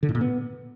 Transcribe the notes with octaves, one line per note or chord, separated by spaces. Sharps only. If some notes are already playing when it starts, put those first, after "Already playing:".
D3
A2
A#2
B3